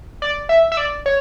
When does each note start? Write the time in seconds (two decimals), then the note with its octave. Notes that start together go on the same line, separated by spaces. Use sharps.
0.22 D5
0.49 E5
0.72 E5
0.77 D5
1.06 C#5